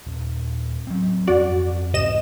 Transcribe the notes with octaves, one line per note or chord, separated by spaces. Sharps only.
D#1
F#3 C4
F2 C#4 F#4 D5
C2 G#2 C3 D#5 E7